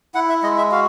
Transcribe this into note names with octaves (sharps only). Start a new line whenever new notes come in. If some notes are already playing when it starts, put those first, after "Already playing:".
E4 F#5
E5
G#3 D#5
E5
F#4 F5